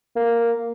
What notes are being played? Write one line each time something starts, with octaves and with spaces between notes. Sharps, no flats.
A#3